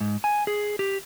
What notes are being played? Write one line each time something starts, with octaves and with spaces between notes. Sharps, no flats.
G#2
G#5
G#4
G4